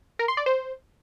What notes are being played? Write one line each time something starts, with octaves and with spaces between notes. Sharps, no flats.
A#4
C6
D5
C5